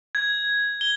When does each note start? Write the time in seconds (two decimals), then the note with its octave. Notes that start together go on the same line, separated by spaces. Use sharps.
0.15 G#6
0.81 G7